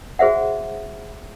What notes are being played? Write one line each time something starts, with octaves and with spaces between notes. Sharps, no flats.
F#4 G#4 C5 E5 F#5